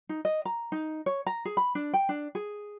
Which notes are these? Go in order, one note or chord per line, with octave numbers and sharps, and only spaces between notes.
D#4
D#5
A#5
D#4
C#5
A#5
G#4
B5
D4
G5
D4
G#4